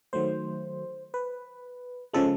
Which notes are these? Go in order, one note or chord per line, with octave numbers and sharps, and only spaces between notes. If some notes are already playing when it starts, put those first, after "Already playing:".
D#3 F#3 A3 C5
B4
C#3 F3 G#3 A4